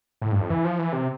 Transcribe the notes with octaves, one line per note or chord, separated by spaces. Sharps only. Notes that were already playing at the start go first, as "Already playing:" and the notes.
A2
G2
F2
E3
F3
E3
C3